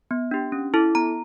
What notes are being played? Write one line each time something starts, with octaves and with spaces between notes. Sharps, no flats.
B3
D4 G4
C#4
E4 A4
B3 A#5